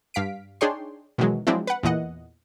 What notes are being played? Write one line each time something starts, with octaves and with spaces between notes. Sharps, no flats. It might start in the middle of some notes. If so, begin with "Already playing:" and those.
G2 F5 B6 D7
D4 D#4 G#4 C#5 G5 C6
B2 D#3 E3 F#3 G#3
F3 F#3 G#3 C4 D4 E4
B4 F#5
E2 A#2 E3 D#5 F#5